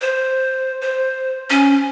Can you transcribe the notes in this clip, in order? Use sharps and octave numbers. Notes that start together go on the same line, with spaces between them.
C5
C5
C#4